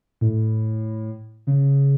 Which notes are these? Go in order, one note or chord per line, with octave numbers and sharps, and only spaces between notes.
A2
C#3